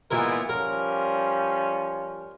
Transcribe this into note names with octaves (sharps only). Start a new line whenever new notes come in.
A#2 E3 G#3 B3 E4 A#4
F3 G3 C#4 A#4